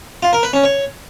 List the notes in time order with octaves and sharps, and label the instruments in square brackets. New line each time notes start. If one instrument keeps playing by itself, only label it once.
[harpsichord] F4
A#4
B4
C#4
C#5